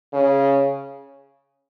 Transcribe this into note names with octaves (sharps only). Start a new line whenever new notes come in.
C#3